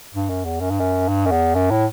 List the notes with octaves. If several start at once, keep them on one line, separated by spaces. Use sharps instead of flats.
G2
F#2
E2
F#2
G2
F#2
G2
F#2
E2
F#2
A2